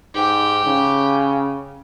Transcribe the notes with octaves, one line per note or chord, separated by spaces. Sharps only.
G#2 G4
C#3